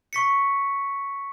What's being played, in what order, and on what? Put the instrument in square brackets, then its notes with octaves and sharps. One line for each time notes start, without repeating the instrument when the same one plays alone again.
[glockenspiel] C#6 B6 C#7